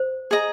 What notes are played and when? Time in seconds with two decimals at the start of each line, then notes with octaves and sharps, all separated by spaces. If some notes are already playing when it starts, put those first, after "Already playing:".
Already playing: C5
0.31 G#4 D#5 A#5